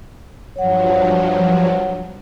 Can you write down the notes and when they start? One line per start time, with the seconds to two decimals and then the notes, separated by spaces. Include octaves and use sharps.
0.56 G2 F3 F#3 C#5 F#5